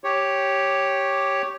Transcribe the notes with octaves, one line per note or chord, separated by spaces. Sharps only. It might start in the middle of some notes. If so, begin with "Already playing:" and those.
G4 C#5